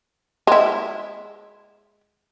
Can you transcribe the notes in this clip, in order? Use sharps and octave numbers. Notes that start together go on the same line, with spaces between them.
G#3 E4